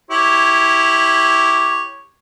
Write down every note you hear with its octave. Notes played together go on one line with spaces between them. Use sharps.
E4 G4 C#5